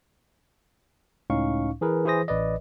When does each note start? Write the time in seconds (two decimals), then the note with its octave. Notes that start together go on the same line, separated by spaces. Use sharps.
1.30 C#2 A2 C#4 D#4 F5 C#6
1.81 E3 G#4 A#4 B4
2.05 E3 E4 G#4 C5 D#6 A#6
2.28 A1 B4 D5 D#5